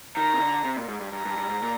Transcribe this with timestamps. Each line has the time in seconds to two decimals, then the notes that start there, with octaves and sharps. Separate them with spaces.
0.16 D#3 A#5
0.34 C3
0.41 D3
0.64 C3
0.77 A#2
0.88 G#2
1.00 G2
1.13 G2 A#5
1.25 G2
1.37 G2
1.49 G#2
1.62 A#2